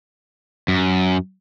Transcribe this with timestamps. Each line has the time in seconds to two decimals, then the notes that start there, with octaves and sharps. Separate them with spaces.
0.68 F#2